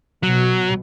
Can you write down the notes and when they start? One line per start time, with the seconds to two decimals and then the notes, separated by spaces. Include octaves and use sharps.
0.23 B2 F#3